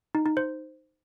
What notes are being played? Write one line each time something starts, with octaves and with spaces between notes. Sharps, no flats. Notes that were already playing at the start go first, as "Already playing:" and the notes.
D#4
D#4
C5